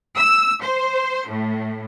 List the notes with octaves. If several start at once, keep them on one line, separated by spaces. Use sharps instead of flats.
E6
C5
A2